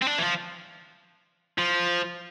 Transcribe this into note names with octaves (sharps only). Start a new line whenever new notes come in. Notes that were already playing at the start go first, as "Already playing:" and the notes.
C4
D4
E3
F3
F3